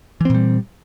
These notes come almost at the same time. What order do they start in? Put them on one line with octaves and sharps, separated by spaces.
E3 C4 A#2 G3